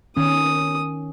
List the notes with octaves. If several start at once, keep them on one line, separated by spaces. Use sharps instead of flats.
D#3 C#4 D#6